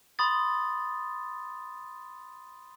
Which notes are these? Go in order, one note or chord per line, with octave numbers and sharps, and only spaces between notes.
B5 C6 D#6 A6